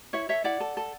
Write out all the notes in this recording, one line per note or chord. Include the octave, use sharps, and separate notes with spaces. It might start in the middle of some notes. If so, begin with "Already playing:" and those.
E4 C#5 E5
A4 C#5 E5
E4 D5 F#5
A4
A4